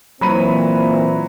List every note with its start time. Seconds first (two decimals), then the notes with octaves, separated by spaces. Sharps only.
0.21 A#2 E3 F#3 C4 B5 D#7